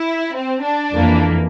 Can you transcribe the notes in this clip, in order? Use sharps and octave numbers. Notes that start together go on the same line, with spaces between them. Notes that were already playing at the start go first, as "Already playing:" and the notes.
Already playing: E4
C4
D4
F2 E3 A#3